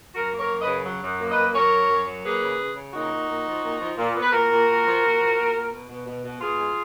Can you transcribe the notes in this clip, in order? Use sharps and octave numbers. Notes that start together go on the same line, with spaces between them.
F#2 F#4 A#4
A#3
A#4 C#5
F#2
B4 D#5
C#3
F#3
F#2
A#3
B4 D#5
F#2
F#3 A#4 C#5
F#2
F#2
F#3
A#3 G#4 B4
C#3
C#3
C#3
A#2 D#4 F#4
A#2
A#2
F3
A#2
F3
A#2
B3
B4
A#2 F#4 A#4
A#2
A#2
F3
A#2
F3
A#2
A#2
B2
B2
B2
B2
B2 F4 G#4
G#3